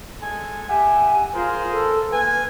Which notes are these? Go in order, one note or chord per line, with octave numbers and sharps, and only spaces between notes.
G#3 A4 G#5
G4 E5 F#5 G#5
F4 G#4 A#4 C5
A4
A#3 B4 G#5